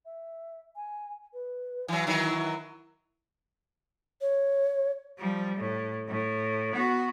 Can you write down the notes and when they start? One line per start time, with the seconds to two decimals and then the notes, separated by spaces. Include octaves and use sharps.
0.05 E5
0.76 G#5
1.33 B4
1.88 E3 F#3 G#5
2.07 D#3 E3 F#3 E4
4.21 C#5
5.18 F3 G3
5.56 A2
6.08 A2
6.71 B3 F#4